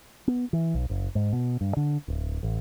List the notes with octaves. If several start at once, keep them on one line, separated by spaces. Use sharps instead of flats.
B3
E3
B1
F#1
G#2
B2
G2
D3
D1
A1